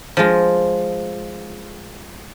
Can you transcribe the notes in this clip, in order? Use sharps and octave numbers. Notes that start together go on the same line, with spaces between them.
F3 G#3 F4